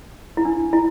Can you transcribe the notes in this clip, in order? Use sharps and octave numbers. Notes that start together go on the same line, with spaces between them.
E4
D4
E4